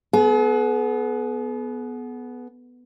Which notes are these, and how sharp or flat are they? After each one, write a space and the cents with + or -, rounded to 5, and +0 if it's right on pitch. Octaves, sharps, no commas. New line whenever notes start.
B3 +0 G#4 +45